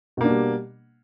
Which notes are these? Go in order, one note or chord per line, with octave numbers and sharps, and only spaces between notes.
B2 G3 A#3 D4